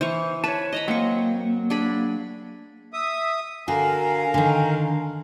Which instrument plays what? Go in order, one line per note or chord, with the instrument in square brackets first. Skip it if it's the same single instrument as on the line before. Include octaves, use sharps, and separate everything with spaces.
[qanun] E3 F5 C#6 [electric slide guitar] C5
[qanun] B4 [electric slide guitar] C#5 A5
[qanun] D#5 A#5 B5
[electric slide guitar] F#3 A#3 [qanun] C4 C#6
[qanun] D4 G#4 B5
[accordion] E5 D#6
[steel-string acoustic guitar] D3 F#4 [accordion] A#4 F5 [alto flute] G#5
[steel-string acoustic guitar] D3 D#3